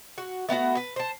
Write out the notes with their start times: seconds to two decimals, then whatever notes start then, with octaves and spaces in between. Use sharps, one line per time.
0.18 F#4
0.49 A3 B3 E4 F#4
0.77 B4
0.96 C5 A5